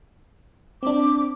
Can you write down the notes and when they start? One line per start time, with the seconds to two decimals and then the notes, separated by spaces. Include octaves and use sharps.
0.83 C4 D4 D6